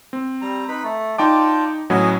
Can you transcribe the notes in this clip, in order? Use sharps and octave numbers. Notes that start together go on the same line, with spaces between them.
C4
G3 A#5
D#4 B4 B5
A3
D#4 F4 D5 G5 A5 D6
A2 F#3 B3 C#4 D#5 G#5